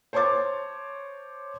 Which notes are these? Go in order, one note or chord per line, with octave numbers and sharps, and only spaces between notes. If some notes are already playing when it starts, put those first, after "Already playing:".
C5 C#5 A5 C6 D6 A6